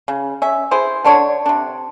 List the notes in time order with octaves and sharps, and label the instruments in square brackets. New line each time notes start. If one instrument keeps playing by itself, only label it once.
[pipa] C#3
C#4 E5
E4 G#4 C5
D3 D4 C#5
C3 D4